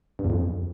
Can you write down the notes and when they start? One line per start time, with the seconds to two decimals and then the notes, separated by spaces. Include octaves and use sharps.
0.19 G2
0.25 E2
0.30 F2